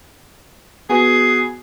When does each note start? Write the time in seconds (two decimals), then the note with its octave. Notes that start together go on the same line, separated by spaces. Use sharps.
0.89 B3 F#4 G#4 B4